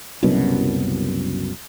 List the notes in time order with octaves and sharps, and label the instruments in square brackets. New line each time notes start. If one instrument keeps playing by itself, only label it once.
[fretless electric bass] F#1 C2 F#2 B2